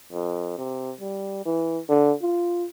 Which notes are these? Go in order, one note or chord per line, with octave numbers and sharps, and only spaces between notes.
F2
C3
G3
E3
D3
F4